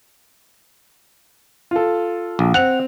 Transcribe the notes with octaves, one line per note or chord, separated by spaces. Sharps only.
F4 A4
A#1
C4 F#5 F7